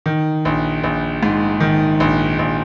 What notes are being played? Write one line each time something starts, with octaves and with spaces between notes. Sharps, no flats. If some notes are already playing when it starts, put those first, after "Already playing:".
D#3
A#1
A#1
G#2
D#3
A#1
A#1